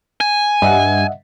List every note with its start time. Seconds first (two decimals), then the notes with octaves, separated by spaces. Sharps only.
0.21 G#5
0.62 G2 D#5 E5 F#5